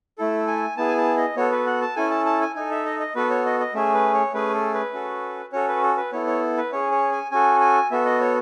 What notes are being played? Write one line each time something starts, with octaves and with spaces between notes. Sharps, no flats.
A3 E4 A4
G#5
B3 E4 G#4 A5
G#5
A5
D#5
B3 F#4 A4 C#5
B4
F#5
A5
C#4 E4 A4 G#5
A5
A5
G#5
D#4 A4 G#5
E5
D#5
D#5
B3 F#4 A4 B4
C#5
D#5
D#5
A3 C#4 G#4 E5
B4
C#5
A3 C#4 G#4 B4
A4
B4
C#4 F#4 A4
C#4 F#4 A4 C#5
B4
A4
B4
B3 E4 A4 C#5
C#5
B4
C#4 G#4 C#5
C#5
G#5
C#4 F#4 A4 G#5
G#5
B3 F#4 A4 E5
D#5
C#5